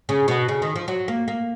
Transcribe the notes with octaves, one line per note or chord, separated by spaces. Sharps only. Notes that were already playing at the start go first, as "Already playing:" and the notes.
C#3
B2
C#3
D#3
F3
F#3
A#3
A#3